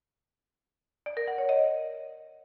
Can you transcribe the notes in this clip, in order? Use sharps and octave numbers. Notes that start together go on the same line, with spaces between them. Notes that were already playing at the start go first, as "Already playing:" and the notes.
D5
A#4
F#5
C#5
D#5